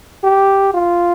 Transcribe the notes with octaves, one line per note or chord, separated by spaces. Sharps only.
G4
F4